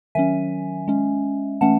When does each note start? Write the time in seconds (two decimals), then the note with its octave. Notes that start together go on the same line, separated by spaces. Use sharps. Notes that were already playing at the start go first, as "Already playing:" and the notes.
0.15 D#3 F#3 C#4 E5 G#5
0.88 G#3 C#4
1.61 E3 A3 C#4 F#5 A5